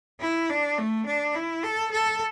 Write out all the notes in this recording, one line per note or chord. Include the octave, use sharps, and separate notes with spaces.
E4
D4
A3
D4
E4
A4
A4